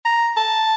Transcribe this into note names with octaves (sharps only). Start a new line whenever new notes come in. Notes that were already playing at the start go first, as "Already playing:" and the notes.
A#5
A5